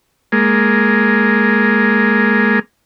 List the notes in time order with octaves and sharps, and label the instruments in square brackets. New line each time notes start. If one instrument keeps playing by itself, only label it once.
[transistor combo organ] G#3 A#3